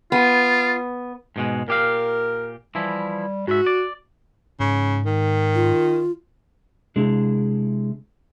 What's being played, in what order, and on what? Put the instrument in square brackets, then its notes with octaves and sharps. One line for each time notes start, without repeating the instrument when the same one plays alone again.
[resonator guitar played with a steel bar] B3 [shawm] F4
[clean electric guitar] G#2 B2 G#3
[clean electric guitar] A#2 G4 F5 [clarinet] A#4
[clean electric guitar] E3 F3 E4 [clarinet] G3
[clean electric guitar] G#2 E5 [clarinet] F#4
[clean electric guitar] D5
[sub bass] G#2 [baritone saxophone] C#3
[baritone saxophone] D#3
[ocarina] F4
[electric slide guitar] C3 G#3 D4 E4 G#4